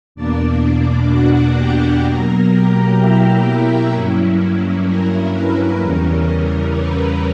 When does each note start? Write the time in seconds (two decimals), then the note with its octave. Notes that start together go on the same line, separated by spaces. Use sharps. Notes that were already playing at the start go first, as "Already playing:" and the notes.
0.15 E2 B2 A#3 D4 D5
1.09 F#4 F#5
1.56 G4 G5
2.03 B2 F#3 A#3 A#4 A#5
2.50 G4 G5
2.98 E4 E5
3.92 G2 F#3 A#3 C#4 E4
4.87 A#4
5.33 B4
5.80 E2 C#3 E3 G3 C#4 A#4
6.74 B4